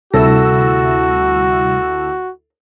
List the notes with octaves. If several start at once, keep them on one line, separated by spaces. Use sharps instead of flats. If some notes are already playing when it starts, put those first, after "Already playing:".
D2 C3 G3 E4 F#4 A4 E6 A#6